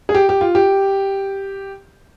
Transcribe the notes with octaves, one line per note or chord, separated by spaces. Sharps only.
G#4
G4
G4
F4
G4